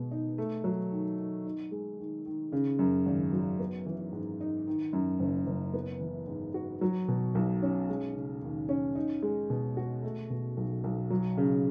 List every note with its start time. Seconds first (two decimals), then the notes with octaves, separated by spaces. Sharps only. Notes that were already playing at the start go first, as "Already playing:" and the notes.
Already playing: B2 G#3 B3
0.11 D#4
0.38 A3
0.64 F#3
0.92 D#3
1.18 D#3
1.45 D#4
1.71 G#3
1.99 D#3
2.26 D#3
2.52 C#3
2.79 F#2
3.06 G#1
3.33 F#3
3.59 B3
3.86 E3
4.13 G#2
4.41 D#4
4.67 D#3
4.93 F#2
5.20 F#1
5.47 F#1
5.74 B3
6.00 E3
6.27 G#2
6.54 F#4
6.81 F#3
7.08 B2
7.35 B1
7.62 C#4
7.89 G#3
8.15 C#3
8.42 D#2
8.69 C#4
8.95 D#4
9.22 G#3
9.50 B2
9.77 F#4
10.03 A3
10.30 B2
10.57 B1
10.84 B1
11.10 F#3
11.37 C#3